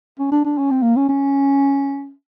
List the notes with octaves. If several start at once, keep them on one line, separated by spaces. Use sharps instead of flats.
C#4
D4
D4
C#4
C4
A#3
C#4
C#4